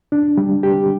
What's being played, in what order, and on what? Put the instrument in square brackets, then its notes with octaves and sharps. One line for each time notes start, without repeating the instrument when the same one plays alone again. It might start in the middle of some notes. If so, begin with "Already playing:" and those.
[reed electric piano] D4
G3
G4